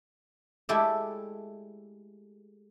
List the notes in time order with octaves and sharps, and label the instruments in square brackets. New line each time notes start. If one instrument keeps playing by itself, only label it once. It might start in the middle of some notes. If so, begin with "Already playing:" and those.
[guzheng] G#3 A3 E4 G4 D5 E5